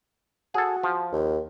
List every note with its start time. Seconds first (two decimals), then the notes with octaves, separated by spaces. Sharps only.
0.54 F#4 G#4 A4
0.83 F3
1.12 D#2